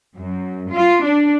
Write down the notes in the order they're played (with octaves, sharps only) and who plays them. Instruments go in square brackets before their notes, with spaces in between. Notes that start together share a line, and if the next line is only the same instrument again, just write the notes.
[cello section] F#2
F4
D4